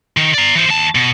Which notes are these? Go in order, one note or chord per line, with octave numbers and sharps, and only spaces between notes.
D#3
D5 A#5
E3 C5
D#2 A5
B2